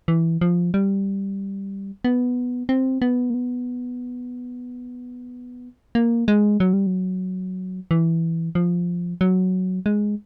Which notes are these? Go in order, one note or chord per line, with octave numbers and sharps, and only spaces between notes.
E3
F3
G3
B3
C4
B3
A#3
B3
A#3
G#3
F#3
G3
F#3
E3
F3
F#3
G#3